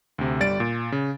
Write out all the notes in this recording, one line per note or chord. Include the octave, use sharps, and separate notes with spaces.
D2 C3
G1 G3 D5 A6 D7
A#2
C#3